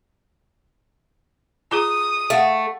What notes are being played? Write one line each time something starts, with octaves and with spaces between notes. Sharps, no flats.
F4 G#4 A#5 D#6
A3 F5 F#5